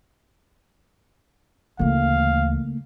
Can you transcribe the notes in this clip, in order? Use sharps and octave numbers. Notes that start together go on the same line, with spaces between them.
D2 C#3 E3 A3 A#3 F5